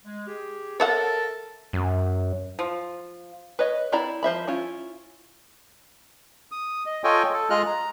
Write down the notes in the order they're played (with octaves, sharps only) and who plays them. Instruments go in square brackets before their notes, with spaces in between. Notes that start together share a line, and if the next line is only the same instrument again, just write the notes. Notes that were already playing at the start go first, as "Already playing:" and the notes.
[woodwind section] G#3
G4 G#4
[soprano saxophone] A4 [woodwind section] A#4 [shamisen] C#5 E5 F#5
[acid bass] F#2
[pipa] F3
[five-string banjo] B4 C#5 D#5
C4 E4 D5 A#5 B5
F3 C5 E5 B5
C#4 E4 F4
[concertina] D#6
D#5
F4 A4 C#5 D#5 G5 G#5
A4
G#3 F4 G#4 D#5 F6 F#6
A#5